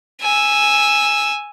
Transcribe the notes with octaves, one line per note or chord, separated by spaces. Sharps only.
G#5 E6